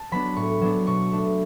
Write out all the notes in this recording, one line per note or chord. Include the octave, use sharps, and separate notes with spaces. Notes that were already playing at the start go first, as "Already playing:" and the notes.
Already playing: A5
F#3 B3 D4 B5
A2 C#6
F#3 B3 D4
B2 C#6
A3 D4